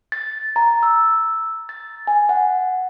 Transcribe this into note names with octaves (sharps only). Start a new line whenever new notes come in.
A6
A#5
E6
A6
G#5
F#5